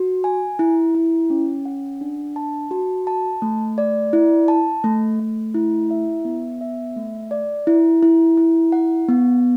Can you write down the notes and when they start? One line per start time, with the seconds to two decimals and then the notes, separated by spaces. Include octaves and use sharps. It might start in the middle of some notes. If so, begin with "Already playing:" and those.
Already playing: F#4
0.24 G#5
0.59 E4
0.95 E4
1.30 C#4
1.65 F#5
2.01 D4
2.36 A5
2.71 F#4
3.07 A5
3.42 A3
3.78 D5
4.13 E4
4.48 A5
4.84 A3
5.20 A3
5.55 E4
5.91 E5
6.25 B3
6.61 E5
6.96 A3
7.31 D5
7.67 E4
8.03 E4
8.37 E4
8.72 F#5
9.09 B3